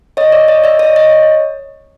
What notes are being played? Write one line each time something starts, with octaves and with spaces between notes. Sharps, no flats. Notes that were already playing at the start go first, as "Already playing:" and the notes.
C#5 D#5
D5 E5
C#5 D#5
D5 E5
C#5 D#5
C#5 D#5